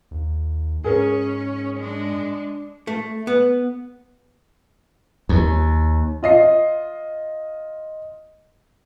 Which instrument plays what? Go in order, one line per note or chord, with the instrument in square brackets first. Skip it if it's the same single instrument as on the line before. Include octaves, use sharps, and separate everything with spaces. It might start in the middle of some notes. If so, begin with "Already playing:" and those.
[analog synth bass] D#2
[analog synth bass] G#2 [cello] C#4 [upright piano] G#4 A#4
[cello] G#3 D4
[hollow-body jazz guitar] A3
B3
[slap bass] D#2
[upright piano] F4 D#5 C7